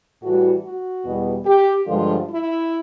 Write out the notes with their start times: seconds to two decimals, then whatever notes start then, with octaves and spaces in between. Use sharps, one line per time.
0.22 A2 E3 G3 F#4
0.64 F#4
1.04 E2 B2 G3
1.45 G4
1.86 G2 D3 F3 G#3 F4
2.26 E4